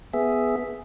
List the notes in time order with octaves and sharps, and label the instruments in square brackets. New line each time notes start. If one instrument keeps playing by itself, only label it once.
[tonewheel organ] B3 G#4 E5